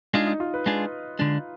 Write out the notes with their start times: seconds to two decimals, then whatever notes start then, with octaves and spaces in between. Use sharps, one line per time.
0.14 G#3 D4 D#4 F4 G#4
0.27 D#4
0.40 F4
0.54 B4
0.66 G#3 D4 F4 G#4
1.19 D3 G#3 D4